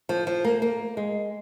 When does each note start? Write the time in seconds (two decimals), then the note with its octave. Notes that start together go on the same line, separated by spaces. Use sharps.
0.09 F3
0.27 F3
0.44 A#3
0.62 A#3
0.97 G#3